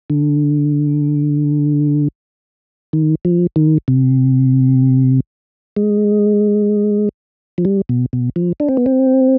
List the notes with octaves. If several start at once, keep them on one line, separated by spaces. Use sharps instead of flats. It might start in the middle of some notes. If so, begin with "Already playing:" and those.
D3
D#3
F3
D#3
C3
G#3
F3
G3
B2
B2
F3
D4
C4
B3
C4